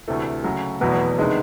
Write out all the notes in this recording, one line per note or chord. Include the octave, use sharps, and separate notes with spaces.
D2 C3 E3 A3
C#3 F#3 A3
F1 E2 B2 F#3 B3
C3 D#3 G#3 B3 D4